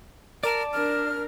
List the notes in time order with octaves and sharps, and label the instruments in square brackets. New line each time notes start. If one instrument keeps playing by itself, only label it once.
[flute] A#4 [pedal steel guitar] D5 A5
[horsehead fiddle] D4 A#4 [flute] F6